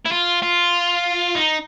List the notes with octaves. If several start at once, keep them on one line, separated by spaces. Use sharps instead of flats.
E4
F4
F4
D#4